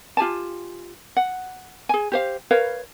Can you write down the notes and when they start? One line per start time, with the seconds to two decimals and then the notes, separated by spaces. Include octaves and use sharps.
0.17 F4 G4 G#5 A5
1.17 F#5
1.89 G#4 G#5
2.12 G4 C5 F5
2.51 A#4 B4 C#5 F5